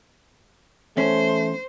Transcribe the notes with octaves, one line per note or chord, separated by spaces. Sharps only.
E2 A3 C#4 C5